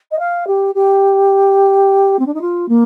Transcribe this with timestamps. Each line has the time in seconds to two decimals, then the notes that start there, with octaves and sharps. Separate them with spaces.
0.11 D#5
0.19 F5
0.47 G4
0.74 G4
2.19 C4
2.26 D4
2.34 D#4
2.41 F4
2.68 A#3